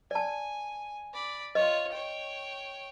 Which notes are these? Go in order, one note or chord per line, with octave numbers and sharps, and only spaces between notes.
D5 G#5 A5
D5 B5
F4 C#5 D#5
C#5 G5